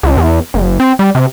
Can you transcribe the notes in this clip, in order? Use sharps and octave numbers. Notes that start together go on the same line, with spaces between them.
C#2
E2
F#1
C4
G3
C3